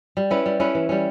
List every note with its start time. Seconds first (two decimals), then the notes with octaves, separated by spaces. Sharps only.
0.17 G3
0.30 C#4 E4 B4
0.46 G3
0.60 C#4 E4 B4
0.75 E3
0.89 G3 C#4